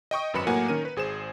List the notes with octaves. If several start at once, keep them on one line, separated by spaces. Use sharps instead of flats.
D#5 G5 C#6 D#6
G#1 F#2 B4 B5 C#7 E7
A2 F#3 A#3 F#5 G#5
D#3 C#4 A#4 D#7
B4
G#1 G#4 C5 E7